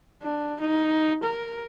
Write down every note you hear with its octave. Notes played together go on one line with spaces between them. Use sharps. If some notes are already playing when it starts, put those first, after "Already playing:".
D4
D#4
A#4